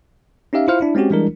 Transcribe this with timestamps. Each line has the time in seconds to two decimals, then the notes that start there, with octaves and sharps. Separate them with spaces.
0.53 C#4 D#4 G4 E5 F5
0.68 E4 F4 C5 F5 F6
0.81 D4 E4
0.95 G#3 C4 C#4 F#4 G4
1.10 E3 G3 G#3 D4 E4 A#4